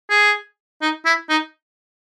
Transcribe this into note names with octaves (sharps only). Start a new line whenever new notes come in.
G#4
D#4
E4
D#4